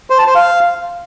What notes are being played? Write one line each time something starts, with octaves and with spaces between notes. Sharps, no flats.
C5
A5
C5
F5